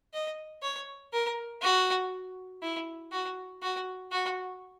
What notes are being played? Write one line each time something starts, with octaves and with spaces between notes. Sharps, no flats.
D#5
C#5
A#4
F#4
E4
F#4
F#4
F#4